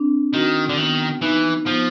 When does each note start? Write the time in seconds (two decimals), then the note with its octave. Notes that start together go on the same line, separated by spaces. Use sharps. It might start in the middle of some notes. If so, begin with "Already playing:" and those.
Already playing: C4 D4
0.33 D#3 F#4
0.69 D3
0.77 D#3 B3
1.21 E3 D#4
1.65 F3 B3